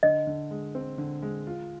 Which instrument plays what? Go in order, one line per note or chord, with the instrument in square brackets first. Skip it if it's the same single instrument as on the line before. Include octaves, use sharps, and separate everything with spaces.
[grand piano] D3 [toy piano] D#5
[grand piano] D3
G#3
C4
D3
G#3
F4